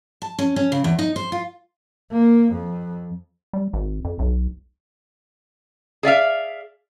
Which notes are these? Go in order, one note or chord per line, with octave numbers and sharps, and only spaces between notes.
A5
C#4
C#4
C#3
E2
D#4
C5
F4
A#3
F2
G3
G#1
F2
B1
G#4 D5 E5 F5